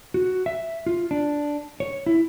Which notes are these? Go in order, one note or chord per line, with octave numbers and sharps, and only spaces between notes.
F#4
E5
F4
D4
C#5
E4